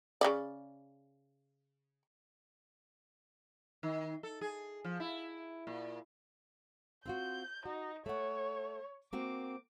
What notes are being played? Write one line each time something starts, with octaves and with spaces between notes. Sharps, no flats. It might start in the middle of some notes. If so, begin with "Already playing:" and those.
C#3 G#3 D5
D#3
A4
G#4
F3
E4
A#2
C4 F4 F#4 G6
D#4 F#4
A3 C#5 F#5
A#3 C4 F#4 D6